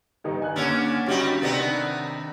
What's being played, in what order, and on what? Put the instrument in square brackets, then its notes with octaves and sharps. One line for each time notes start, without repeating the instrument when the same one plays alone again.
[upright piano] G2 D#3 D#4
G#5 F#6
[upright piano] D#2 E6 F7 [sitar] D3 C#4 D4
[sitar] G2 G3 D#4 [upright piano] C#4 F#4 G4
[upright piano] C3 D#3 D4 [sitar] B3 C4 D#4